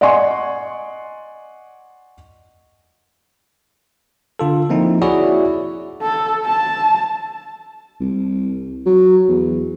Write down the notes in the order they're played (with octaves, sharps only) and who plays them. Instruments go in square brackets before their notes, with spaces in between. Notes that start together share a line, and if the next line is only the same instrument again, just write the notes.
[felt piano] D5 D#5 F#5 G#5 C6 C#6
[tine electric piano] D3 F4 A4
F3 A#3 C4 D#4 E4
E4 F#4 G#4 C#5 D5 E5
[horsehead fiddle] A4
A5
[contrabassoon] C2
F#3
E2